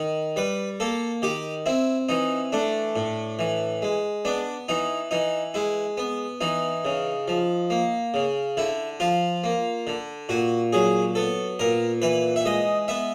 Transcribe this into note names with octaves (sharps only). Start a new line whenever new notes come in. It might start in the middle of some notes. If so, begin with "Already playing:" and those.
Already playing: D#3
G3 B4
A#3 A4
D#3 G4
C4 E4
E3 D#4
A3 D4
A2
E3
G#3
B3 D4
E3 D#4
E3 D#4
G#3 E4
B3
E3 D#4
C#3
F3
A#3
C#3
D3 E4
F3 F4
A#3
D3
A#2 F#4
F#3 G#4
B3 A4
A#2 A#4
E3 B4
E5
G#3 D#5
B3 E5